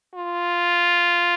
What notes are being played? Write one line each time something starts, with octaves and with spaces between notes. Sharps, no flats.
F4